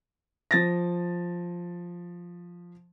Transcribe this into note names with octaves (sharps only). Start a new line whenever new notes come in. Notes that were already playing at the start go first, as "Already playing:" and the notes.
F3 A6 A#6